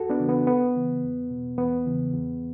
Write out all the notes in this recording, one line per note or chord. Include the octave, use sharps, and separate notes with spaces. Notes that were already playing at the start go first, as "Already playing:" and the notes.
Already playing: E2 F#4 A4
B3 D4
C#3 E3
B3
D2 B3
C#3 E3
E2
B2
E2 B3
C#3 E3
E2